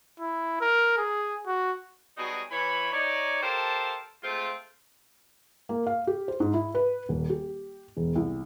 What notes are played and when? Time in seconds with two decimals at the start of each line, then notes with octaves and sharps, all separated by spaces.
0.20 E4
0.61 A#4
0.98 G#4
1.47 F#4
2.17 B2 F#3 G3 D#4 F#4 G#4
2.51 E3 C#5 B5
2.93 D#4 C#5 D5
3.43 G4 A4 A#4 C5 F5 A5
4.23 G#3 A3 C4 F4
5.69 A#3
5.86 F5
6.07 G4
6.28 C5
6.40 G#2
6.54 E4
6.75 B4
7.09 D#1
7.30 G4
7.97 E1
8.16 C2